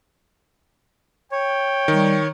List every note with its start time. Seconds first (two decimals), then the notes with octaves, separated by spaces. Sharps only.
1.32 C#5 G5
1.88 D#3 G3